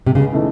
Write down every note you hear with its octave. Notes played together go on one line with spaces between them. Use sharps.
C3
C#2 C#3
C#3 E3 A3 D#4